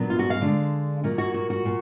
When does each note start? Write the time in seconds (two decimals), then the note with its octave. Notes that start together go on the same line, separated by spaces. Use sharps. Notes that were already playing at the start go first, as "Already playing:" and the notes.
Already playing: A#2 F#3 B3 D4
0.10 F4
0.19 F#4
0.30 F5
0.41 D3 G#3 D4
1.04 A#2 F#3 A#3
1.18 F#4
1.34 F#4
1.50 F#4
1.65 A#2